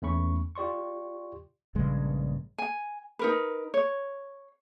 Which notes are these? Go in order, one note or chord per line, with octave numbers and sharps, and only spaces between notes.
E2 A3 C#4 B5 C#6
F4 G4 D5 C6 C#6
A#1 G2 C#3 G#3
G#5
D#4 A#4 B4
C#5